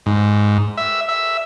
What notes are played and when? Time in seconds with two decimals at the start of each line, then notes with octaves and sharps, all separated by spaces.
0.06 G#2
0.77 E5
1.09 E5